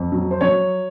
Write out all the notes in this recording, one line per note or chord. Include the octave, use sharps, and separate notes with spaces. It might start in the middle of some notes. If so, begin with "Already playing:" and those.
Already playing: F2
F#3
C5
F#3 C#5